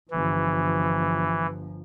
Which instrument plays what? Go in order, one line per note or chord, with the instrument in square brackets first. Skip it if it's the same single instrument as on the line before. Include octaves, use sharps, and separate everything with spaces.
[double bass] G1 F3 [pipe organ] E3